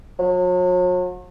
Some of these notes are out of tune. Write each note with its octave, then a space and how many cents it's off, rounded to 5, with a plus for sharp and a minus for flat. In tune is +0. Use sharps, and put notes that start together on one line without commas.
F#3 -40